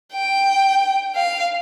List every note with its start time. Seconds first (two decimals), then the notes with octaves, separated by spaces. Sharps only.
0.13 G5
1.15 F5